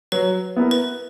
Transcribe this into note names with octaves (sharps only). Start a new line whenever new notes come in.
F#3 B4
B3 E4 A#4
B4